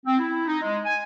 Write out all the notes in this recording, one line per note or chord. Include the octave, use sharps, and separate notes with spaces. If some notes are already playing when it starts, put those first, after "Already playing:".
C4
E4
D#4
G#3
G#5